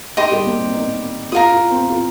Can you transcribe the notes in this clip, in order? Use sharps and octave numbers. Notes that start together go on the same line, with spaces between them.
D#4 G4 D#5 C6 D#6
G3
A#3
C4
D#4
F4 A#4 F5 D#6
F4
C4
F4